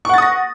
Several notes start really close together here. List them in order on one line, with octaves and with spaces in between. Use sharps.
C#6 F#5 A6 D#6 A#6